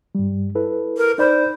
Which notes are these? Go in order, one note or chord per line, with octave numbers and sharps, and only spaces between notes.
G2 G3
E4 A4 B4
A#4
D#4 C5 D5 B5